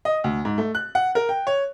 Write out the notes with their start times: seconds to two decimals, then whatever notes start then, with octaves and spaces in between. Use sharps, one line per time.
0.05 D#5
0.24 D2
0.45 G#2
0.58 A3
0.75 F#6
0.95 F#5
1.15 A#4
1.29 G5
1.47 C#5